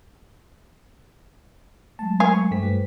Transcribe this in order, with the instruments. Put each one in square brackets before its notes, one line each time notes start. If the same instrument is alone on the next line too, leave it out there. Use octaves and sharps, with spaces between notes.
[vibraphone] F#3 G#3 A3 [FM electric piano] A5
[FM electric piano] A#4 [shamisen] F5 G#5
[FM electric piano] C#6
[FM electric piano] G2 A3 B6 [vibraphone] C5 G5
[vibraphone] F#4 B4